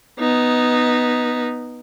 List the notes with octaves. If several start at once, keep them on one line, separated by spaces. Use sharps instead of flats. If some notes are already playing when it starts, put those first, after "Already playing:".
B3 D#4